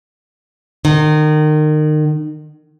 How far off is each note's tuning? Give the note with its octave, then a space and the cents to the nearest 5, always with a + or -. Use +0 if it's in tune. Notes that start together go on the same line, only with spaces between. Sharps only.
D#3 -30